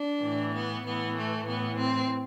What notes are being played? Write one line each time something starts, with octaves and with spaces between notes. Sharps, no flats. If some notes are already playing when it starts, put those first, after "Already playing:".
Already playing: D4
A2 E3
B3
A2 E3 B3
A3
A2 E3 B3
C4